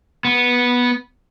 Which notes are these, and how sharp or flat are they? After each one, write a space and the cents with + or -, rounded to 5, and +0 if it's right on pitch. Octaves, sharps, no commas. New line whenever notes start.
B3 -10